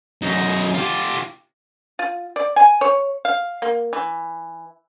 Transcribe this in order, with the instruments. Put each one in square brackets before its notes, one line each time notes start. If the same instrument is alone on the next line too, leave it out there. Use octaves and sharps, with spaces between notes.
[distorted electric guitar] F#2 D#4
F4 G4
[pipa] F4
D5
G#5
C#5
F5
A#3
E3